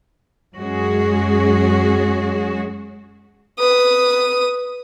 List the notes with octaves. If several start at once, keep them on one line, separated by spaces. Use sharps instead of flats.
F#2 G#3 C#4 F#4 G#4
B4 D#6